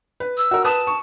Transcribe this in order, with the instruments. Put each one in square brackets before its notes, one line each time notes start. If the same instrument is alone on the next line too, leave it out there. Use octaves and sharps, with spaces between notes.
[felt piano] B4
[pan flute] E6
[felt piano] F#4 A#4
[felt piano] B4 D#6 [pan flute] A5
[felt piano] C#6